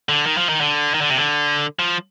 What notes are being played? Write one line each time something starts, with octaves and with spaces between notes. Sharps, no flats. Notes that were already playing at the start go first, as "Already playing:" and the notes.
D3
D#3
F3
D#3
D3
D#3
D3
C3
D3
F3